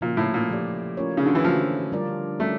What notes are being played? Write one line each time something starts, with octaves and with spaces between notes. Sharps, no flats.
A#2 C#3 F3 A#3
A2
A#2
F3 A3 E4 G4 D5
A3 C#4 F4 A#4 C#5
C#3
D3
E3
D3 F3 A3 D4
G3 D4 F4 A#4 D5
G3 A3 C#4